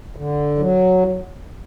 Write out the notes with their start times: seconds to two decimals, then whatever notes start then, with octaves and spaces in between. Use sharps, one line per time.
0.16 D3
0.58 F#3